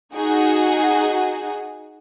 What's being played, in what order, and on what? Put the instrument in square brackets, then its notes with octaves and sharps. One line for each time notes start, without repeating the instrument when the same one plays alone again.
[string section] D#4 F#4 G#4